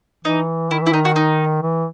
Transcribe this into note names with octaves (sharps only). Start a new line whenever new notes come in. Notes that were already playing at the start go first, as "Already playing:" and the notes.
E3 D#4
D#3 E4
E3
E4
D#3 D#4
F#4
D#4
E3